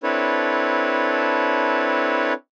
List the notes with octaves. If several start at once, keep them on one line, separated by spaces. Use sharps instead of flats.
C4 D4 E4 A4 B4 C#5